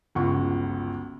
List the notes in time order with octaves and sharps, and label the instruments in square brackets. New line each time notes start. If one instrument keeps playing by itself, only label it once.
[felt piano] G1 C#2 F#4 C#6